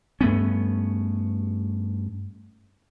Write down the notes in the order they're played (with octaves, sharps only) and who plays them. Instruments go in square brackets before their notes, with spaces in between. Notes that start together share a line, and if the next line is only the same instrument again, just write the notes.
[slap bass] G2 A3 B3 C#4